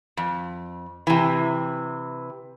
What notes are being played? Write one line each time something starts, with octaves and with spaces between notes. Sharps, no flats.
F2
C3 E3